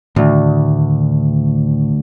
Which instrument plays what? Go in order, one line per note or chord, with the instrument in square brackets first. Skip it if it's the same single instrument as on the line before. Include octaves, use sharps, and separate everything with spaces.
[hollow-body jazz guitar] D2 [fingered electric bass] A2 D#3